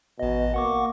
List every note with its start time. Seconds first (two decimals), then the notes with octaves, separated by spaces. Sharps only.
0.19 A1 B2 D#5
0.54 A#3 F#5 C#6 D6